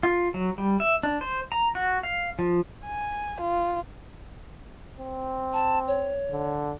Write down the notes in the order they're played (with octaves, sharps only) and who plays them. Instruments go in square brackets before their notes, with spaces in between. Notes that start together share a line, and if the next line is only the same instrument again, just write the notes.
[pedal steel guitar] F4
F#3
G3
E5
D4
C5
A#5
F#4
F5
F3
[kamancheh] G#5
F4
[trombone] C4
[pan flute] A5
C#5
[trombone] D3